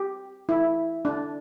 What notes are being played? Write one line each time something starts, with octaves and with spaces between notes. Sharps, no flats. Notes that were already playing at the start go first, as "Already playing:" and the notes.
Already playing: G4
E4
D4